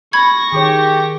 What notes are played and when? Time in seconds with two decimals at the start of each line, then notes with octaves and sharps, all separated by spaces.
0.13 B5 C#6 G#6 A#6
0.53 D#3 G4 G#4 C#5